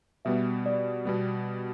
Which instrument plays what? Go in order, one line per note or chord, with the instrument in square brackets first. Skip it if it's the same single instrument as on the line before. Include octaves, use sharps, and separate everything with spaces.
[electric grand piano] B2 G3 B3 [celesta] E5
[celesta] D5
[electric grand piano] B2 G3 B3